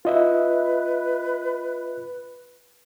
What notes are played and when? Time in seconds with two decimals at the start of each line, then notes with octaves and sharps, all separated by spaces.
0.05 F4 B4 D#5 E5